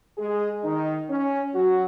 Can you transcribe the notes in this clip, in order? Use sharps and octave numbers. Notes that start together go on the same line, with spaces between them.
G#3 G#4
D#3 D#4
C#4
F#3 F#4